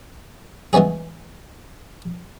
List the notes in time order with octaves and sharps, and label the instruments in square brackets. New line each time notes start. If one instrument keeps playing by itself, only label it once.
[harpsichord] E3 G#3 B3 C#4 G#4